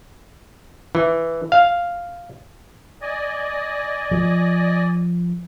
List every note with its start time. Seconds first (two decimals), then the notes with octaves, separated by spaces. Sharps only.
0.95 E3
1.52 F5
3.02 D5 D#5 G#5
4.11 F3